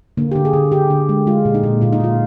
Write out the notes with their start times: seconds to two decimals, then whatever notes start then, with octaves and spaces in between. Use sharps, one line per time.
0.17 D3 A#3
0.31 G4
0.35 D3
0.45 G#4
0.53 D3
0.72 D3 G4
0.90 D3
1.09 G#3
1.27 G#3 F4
1.45 A#2
1.54 D#4
1.63 A#2
1.81 A#2 F4
1.92 D#4
2.00 A#2 F4